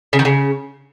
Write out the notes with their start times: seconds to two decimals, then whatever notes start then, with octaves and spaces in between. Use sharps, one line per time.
0.13 C#3
0.19 D#3
0.25 C#3